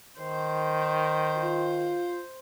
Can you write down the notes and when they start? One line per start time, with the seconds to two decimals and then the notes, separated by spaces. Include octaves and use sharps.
0.18 D#3 C5
1.37 F4